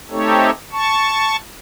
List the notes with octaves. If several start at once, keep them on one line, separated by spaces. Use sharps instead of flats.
A3 C4 D#4 G4 A4 C#5
A5 C#6